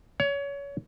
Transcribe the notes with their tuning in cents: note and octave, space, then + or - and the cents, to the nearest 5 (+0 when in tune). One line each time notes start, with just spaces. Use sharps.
C#5 +25